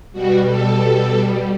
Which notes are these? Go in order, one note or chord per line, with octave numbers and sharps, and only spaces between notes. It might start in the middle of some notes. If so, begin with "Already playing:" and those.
B2 G3 F#4
A4